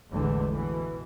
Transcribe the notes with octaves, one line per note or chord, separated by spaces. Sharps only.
A1 E2 D3 E3 G#3 A3
B2 E3